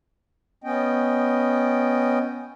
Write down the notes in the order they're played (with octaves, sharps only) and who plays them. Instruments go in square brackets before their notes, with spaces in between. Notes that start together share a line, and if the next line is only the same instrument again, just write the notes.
[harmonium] B3 C#4 D#5 G5